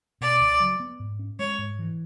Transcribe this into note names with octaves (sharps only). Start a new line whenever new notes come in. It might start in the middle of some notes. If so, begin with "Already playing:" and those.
B2 D5
C#2
F#3
B3
G#2
C#4
G#3 C#5
G#2
E3